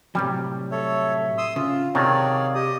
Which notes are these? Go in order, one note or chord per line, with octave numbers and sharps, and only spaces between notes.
A2 C3 F#3 G3
A4 C#5 E5
C6 D#6 E6
C#3 F4 F5
C3 D#3 F#3 G#4 C#5 D5 A5
G4 D#5 D#6